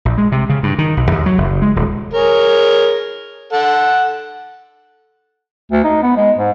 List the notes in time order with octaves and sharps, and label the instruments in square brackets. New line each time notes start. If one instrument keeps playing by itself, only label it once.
[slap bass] A#1
G#3
C3
C#3
G2
D#3
B1
D#2
F#3
F#1
G#3
D#1
[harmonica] G#4 A#4 C#5
A4 F#5
[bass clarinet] D2
D#4
B3
G#3
G#2